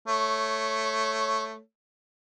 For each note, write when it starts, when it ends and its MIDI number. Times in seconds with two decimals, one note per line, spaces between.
0.08 1.59 57
0.08 1.59 73